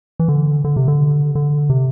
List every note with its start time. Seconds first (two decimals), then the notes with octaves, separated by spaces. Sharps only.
0.20 E3
0.28 D3
0.64 D3
0.76 C3
0.88 D3
1.35 D3
1.70 C3